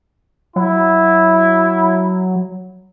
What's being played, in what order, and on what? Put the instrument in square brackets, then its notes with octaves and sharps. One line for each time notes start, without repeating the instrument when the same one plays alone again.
[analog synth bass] F#3 [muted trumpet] E4